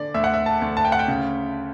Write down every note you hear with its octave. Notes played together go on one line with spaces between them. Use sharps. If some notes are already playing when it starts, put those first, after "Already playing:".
Already playing: D3 D5
D2 E5
F#5
E5
A5
D2
A5
G5
F#5
G5
C#3